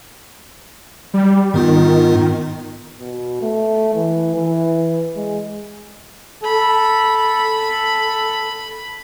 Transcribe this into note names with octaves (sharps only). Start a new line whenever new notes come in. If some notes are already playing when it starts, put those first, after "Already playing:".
G3
G#2 D#3 B3 F4
B2
A3
E3
E3
G#3
A4 B5